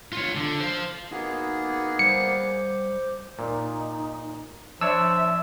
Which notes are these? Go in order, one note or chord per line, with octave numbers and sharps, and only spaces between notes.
F4 C#5
D3
C5 F5
A#3 B3 D#4 F#4 G#4
G3 C5 D6 G6 C#7
A#2 D#4
F3 D4 C#5 E5 E6